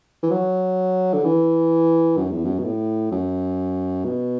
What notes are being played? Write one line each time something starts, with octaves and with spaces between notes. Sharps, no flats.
E3
F#3
D3
E3
F#2
E2
F#2
B2
A2
F#2
B2